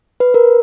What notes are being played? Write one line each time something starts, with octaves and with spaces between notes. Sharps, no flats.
B4
A#4